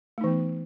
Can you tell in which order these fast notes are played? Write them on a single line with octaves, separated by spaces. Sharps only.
A3 D#4 E3 B3